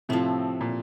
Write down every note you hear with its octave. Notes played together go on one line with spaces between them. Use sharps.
A2 C3 F3 A3 C4
A#2